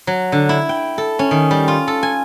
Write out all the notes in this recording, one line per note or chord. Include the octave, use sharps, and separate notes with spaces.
F#3
D3
E4
G5
A4
C#4
D#3
G3
F4
A4
G#5